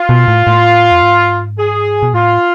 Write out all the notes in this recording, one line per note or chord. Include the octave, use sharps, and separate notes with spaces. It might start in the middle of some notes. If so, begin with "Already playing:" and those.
Already playing: F4
B2
A2
A2
F2
G#2
G#4
B2
A2 F4